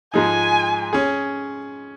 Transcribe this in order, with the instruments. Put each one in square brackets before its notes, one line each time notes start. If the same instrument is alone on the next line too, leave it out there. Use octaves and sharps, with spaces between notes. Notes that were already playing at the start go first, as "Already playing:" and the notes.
[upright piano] G#2 F3 G#3 D#4 [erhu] G#5
[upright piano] C#4 G#4